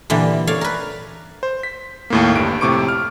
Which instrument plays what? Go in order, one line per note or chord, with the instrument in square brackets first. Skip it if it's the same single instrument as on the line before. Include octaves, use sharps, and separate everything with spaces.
[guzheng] A#2 D3 E3 G3
A4 C#5 D5 F5
A#4 B4
[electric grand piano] C5
B6
D#2 A2 A#3
G1 G2 D7
F2 A2 C3 C#6 D6 D7
F6